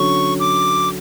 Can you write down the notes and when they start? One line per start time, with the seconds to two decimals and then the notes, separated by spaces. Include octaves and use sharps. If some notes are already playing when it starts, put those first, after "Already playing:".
Already playing: D3 F#3 C#4 C#6
0.40 D6